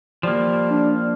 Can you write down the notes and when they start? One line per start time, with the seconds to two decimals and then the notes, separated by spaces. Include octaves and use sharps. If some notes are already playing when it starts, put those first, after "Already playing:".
0.23 F3 G3 A#3
0.71 D4